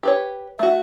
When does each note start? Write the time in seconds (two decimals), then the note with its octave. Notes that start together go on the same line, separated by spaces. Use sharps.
0.03 G4 B4 C#5
0.59 A3 F#4 E5